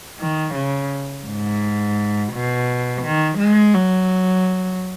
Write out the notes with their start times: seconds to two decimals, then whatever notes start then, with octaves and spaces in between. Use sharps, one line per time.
0.20 D#3
0.55 C#3
1.27 G#2
2.33 B2
3.03 D#3
3.39 G#3
3.75 F#3